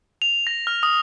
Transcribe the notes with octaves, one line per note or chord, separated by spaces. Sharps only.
F7
A#6
F6
D#6